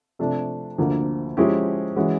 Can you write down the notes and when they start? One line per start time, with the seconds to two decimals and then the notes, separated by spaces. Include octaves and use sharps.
0.19 C3 F3 A3 D4
0.78 D2 D3 F3 A#3
1.37 F3 G#3 C#4 E4 G4
1.96 E3 G#3 C#4 F#4